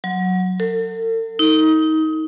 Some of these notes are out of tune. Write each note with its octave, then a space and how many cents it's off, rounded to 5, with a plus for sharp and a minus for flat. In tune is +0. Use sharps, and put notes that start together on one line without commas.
F#3 -5
A4 +40
D#4 +25